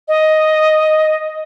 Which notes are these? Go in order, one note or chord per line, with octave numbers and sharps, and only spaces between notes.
D#5